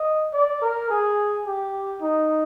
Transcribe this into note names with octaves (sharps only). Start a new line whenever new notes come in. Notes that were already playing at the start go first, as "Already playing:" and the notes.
Already playing: D#5
D5
A#4
G#4
G4
D#4